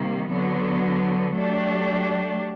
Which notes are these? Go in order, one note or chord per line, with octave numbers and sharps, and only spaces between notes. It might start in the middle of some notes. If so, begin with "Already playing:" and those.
Already playing: C3 D#3 G3 A#3
D3 F#3 B3
F#3 A3 D4 G4